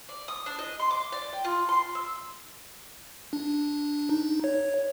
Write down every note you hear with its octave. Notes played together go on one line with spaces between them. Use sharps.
D5
D#6
D4
D#5
C6
D6
D5
G5
F4
C6
E6
D4
D#4
C#5